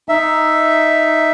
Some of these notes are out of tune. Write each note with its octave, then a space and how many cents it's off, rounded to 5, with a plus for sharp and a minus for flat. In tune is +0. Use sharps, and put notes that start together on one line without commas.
D#4 +0 E5 +0